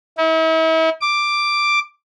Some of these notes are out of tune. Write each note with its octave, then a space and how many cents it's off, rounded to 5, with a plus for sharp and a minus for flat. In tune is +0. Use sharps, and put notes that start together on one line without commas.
E4 -40
D6 +5